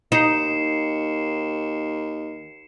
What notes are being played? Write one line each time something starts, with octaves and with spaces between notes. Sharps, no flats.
D#2 D#4 C7 C#7 E7